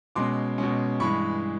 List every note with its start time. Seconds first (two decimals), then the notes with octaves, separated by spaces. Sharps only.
0.15 B2 G#3 C#4 C6 D6
0.58 B2 G#3 C#4
1.00 G2 E3 G#3 B5 C#6